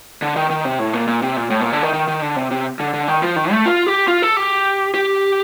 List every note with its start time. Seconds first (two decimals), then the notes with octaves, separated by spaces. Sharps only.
0.22 D3
0.36 D#3
0.50 D#3
0.65 C3
0.79 A2
0.93 A#2
1.07 A#2
1.22 C3
1.37 A#2
1.50 A2
1.61 A#2
1.72 D3
1.83 D#3
1.93 D#3
2.08 D#3
2.22 D3
2.36 C3
2.51 C3
2.80 D3
2.94 D3
3.08 D#3
3.22 F3
3.36 D#3
3.51 A3
3.66 F4
3.87 G4
4.08 F4
4.22 A4
4.37 G4
4.94 G4